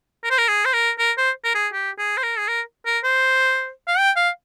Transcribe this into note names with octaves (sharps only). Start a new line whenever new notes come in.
A#4
C5
A#4
G#4
C5
A#4
A#4
C5
A#4
G#4
G4
G#4
C5
A#4
G#4
A#4
A#4
C5
F5
G5
F5